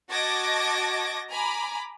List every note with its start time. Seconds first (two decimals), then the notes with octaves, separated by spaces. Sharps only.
0.11 F#4 D#5 A5 D6 G#6 A#6
1.30 G#5 A#5 B5 D6